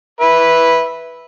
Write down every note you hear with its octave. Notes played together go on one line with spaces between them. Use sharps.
B4 E5